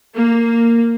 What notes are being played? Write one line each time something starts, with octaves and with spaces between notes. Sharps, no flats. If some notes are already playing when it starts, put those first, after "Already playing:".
A#3